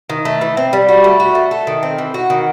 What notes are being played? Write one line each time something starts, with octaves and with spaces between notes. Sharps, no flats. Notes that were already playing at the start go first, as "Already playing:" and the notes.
D#3
A3
E3
C4
G3
F#4
A3
F#4
A3
A4
D#3
C4
E3
F#4
D#3